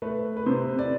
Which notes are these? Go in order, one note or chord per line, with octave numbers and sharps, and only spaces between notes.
A3 B4
B4
C3 C5
D5